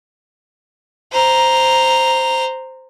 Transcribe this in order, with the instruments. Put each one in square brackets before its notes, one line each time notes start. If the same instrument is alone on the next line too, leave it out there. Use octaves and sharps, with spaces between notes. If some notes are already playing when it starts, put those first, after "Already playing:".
[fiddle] C5 A#5